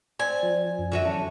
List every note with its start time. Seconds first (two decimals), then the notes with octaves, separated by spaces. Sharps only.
0.19 C4 D5 G#5
0.43 F3
0.78 F#2
0.92 D3 F#4 E5
1.06 E3 F#3 C#4 A5